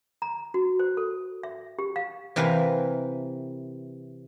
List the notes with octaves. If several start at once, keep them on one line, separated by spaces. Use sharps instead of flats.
A#5
F#4
C5
A4
E5
G4
F5
C3 E3 A#4 B4 F5 G5